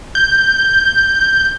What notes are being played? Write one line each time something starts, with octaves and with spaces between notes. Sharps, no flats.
G6